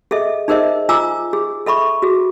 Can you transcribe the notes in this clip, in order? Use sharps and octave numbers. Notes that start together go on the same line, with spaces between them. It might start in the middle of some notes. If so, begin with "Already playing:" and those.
G#4 A4 D#5 E5
D#4 G#4 A#4 C5 D#5 E5
F4 G#5 A#5 D6 E6
G#4
A4 E5 B5 C#6
F#4 G#4